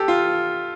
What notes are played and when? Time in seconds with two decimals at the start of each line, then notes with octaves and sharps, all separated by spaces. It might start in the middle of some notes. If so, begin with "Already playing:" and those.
Already playing: G4 A4
0.08 F4